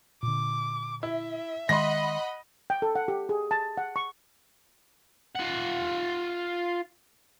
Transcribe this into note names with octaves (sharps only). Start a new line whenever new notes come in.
A#2 D3 D6
E4 E5
D#3 G#3 D#5 F#5 B5 C6 A#6
G5
A4
F#5
G4
G#4
A5
F#5
C#6
F4 F#5